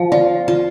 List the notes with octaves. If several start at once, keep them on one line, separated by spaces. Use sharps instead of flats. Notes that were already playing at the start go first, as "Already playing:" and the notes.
Already playing: F3 F5
F4 D5
F4